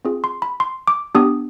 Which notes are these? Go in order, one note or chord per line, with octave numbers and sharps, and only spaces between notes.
C4 F4 G#4
C6
B5
C6
D6
B3 D4 G4 D#6